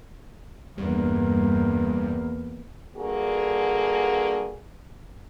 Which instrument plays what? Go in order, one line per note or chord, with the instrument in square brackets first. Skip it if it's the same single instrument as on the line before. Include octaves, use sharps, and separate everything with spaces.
[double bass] E2 A#3 [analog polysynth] G2
[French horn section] G2 D3 A#3 F#4 G#4